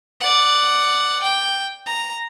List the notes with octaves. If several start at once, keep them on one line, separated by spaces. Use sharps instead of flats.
D5 F#5
G5
A#5